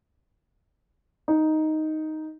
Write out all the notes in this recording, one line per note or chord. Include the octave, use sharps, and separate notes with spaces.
D#4